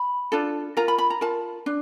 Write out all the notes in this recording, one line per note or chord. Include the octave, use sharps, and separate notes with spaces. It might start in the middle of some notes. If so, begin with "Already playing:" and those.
Already playing: B5
D4 F4 A4
F4 A#4 A#5
B5
B5
A#5
F4 A#4 A5
D4